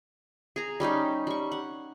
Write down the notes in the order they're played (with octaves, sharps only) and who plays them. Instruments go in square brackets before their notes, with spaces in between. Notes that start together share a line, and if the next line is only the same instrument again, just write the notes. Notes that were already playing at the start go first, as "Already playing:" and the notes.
[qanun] G#4 A#5
G3 C#4 D#4 G4
G3 C#6
F#5